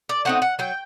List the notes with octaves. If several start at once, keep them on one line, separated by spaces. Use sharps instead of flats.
D5
A3 C4 D#4 F#5
F#5
F#3 G5